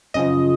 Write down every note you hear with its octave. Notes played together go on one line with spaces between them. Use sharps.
F#2 C#3 F3 D#5